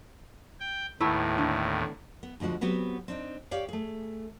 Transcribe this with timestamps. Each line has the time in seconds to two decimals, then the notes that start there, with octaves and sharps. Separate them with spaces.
0.60 G5
1.00 D#2 A2 A3 B3 E4
1.38 D3
2.23 B3
2.40 D2 B2 F3 G#3 F#4
2.61 F#3 B3 C4 F#4 G4 B4
3.08 C4 D4 D#4
3.51 G4 C#5 D5 F5 G5
3.69 A3 G#4